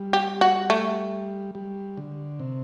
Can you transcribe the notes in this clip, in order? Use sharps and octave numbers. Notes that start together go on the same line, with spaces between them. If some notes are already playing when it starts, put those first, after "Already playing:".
Already playing: G3
G4
F#4
A3
G3
D3
C3